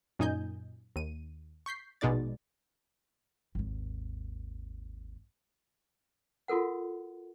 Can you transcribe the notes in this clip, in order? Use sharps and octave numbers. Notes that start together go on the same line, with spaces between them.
F#2 A#2 D#4 D#5 G#5 G6
D#2 D#7
C#6 G6 B6 C7
A#1 B2 G#3 D#4 D5 A6
G#1 D#2
F4 F#4 A4 A#4 F#5